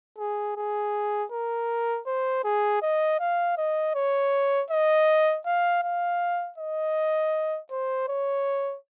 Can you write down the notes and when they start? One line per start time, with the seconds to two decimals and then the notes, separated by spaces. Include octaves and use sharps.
0.19 G#4
0.57 G#4
1.32 A#4
2.07 C5
2.44 G#4
2.82 D#5
3.20 F5
3.57 D#5
3.95 C#5
4.71 D#5
5.46 F5
5.83 F5
6.58 D#5
7.71 C5
8.09 C#5